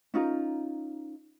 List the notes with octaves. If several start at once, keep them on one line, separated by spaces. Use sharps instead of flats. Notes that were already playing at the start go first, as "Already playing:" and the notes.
C#4 D#4 F4 A#4